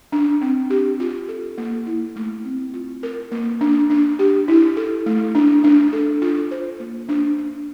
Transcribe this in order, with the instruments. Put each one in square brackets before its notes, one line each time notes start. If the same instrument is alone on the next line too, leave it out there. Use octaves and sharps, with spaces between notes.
[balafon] D4
C4
G4
F4
A4
A#3
E4
A3
C4
F4
A#4
A#3
D4
D4
G4
E4
A4
A3
D4
D4
A4
F4
C5
A#3
D4
D4